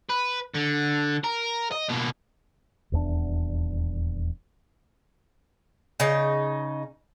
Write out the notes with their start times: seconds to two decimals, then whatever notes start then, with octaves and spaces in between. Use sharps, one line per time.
0.09 B4
0.54 D3
1.24 A#4
1.72 D#5
1.90 B2 A#3
2.92 D#1 E2 E3 D4
6.00 C#3 D#4